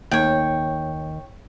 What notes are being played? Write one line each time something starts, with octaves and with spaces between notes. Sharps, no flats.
D#2 C#5 G5